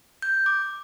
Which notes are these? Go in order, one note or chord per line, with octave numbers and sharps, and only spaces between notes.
G6
D6